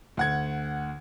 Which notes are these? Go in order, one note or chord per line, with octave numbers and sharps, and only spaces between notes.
D2 F#5 G#6